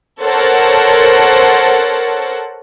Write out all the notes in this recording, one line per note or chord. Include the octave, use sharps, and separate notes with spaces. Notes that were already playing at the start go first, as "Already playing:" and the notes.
A4 A#4 C5 C#5 F#5 A5